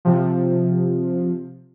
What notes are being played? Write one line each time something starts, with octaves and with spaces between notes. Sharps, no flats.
C3 F3